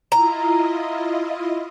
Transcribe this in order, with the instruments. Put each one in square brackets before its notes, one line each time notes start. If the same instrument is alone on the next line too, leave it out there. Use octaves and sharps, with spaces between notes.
[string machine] E4 F4 D#5 [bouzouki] A#5